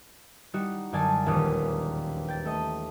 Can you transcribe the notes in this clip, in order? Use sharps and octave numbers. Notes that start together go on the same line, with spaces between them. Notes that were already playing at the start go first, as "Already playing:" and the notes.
G3 D#4 F#4
F#2 D3 D#4 D5 G#5 A5
E1 A#1 D#2 A#3 C#4 D#6
G5 A6
A3 D#5